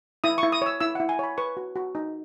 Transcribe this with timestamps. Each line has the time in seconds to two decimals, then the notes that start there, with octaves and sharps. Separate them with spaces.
0.24 E4 D#6
0.38 E4 C#6
0.52 D#6
0.62 C#5 E6
0.80 E4 E6
0.95 E4 F#5
1.09 G#5
1.19 C#5 B5
1.38 B4 C#6
1.57 F#4
1.76 F#4
1.95 D#4